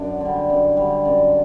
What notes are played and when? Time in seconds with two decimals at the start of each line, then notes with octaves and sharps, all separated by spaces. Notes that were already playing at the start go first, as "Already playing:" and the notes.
Already playing: F#2 D4
0.21 D3 G3
0.50 F#2
0.77 D3 G3
1.05 F#2